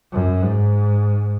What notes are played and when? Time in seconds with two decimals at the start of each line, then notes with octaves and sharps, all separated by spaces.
0.12 F#2
0.41 G#2